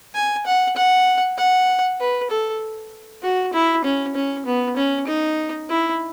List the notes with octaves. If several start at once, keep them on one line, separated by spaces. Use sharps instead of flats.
G#5
F#5
F#5
F#5
B4
A4
F#4
E4
C#4
C#4
B3
C#4
D#4
E4